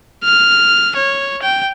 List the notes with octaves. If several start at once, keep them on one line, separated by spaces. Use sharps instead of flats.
F6
C#5
G5